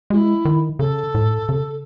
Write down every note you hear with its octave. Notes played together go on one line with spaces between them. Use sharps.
G#3 E4 F#4
D#3
C#3 A4
A2
C#3